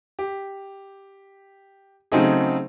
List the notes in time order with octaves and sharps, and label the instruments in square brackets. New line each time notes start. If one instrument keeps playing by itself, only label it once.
[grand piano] G4
C#3 F#3 A3 C4 D#4 G#4